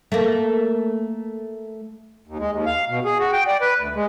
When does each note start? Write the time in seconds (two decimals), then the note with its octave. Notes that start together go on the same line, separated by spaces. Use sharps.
0.12 A3 A#3
2.27 D#2
2.39 G#3
2.51 D#2
2.66 F5
2.89 B2
3.05 G#4
3.19 F#4
3.33 G5
3.47 D5
3.61 B4
3.79 D2
3.95 G#3